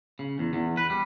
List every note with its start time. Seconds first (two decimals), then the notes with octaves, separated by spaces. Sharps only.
0.19 C#3
0.39 E2
0.53 E2
0.77 B4
0.90 G3